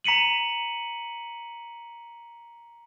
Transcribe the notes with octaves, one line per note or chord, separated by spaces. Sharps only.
A#5 B6 C#7 D#7 F#7